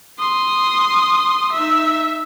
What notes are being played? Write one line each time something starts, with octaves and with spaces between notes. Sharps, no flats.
C6 D#6
D#4 E5